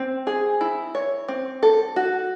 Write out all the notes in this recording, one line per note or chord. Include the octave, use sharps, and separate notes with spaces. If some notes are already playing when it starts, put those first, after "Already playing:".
Already playing: C4
G#4
E4
C#5
C4
A4
F#4